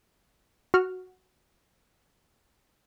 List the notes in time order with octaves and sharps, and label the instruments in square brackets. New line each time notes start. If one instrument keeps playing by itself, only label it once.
[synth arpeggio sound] F#4 F6